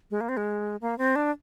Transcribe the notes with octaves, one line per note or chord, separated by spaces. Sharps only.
G#3
A#3
C4
G#3
A#3
C4
D4